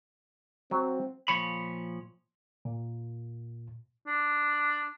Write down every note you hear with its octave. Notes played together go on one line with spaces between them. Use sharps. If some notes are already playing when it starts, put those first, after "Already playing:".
F#3 C4
A#2 F3 C#5 B5
A#2
D4